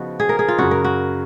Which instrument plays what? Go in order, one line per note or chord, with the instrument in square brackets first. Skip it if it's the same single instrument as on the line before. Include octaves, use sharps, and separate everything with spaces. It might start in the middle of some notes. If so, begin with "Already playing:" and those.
Already playing: [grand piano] C#3 F3 B3 D#4 [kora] F#4
[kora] G#4
A#4
G#4
F4
[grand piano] F#2 C#3 F#3 [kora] F#4
[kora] A#4
F#4